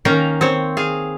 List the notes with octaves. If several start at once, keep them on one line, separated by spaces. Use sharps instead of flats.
D#3 A#3 C#4 F5 G5 A#5
C4 C5 C#5
G#4 F5